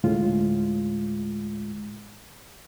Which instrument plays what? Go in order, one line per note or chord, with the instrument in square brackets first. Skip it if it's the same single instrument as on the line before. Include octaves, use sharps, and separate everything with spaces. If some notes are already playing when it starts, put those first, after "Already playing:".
[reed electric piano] D2 A2 G#3 F4